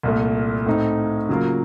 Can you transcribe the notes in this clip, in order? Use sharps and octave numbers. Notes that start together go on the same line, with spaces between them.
C2 A#2 A3
A2 A3 C4 D#4
C#3 F#3 A#3 F4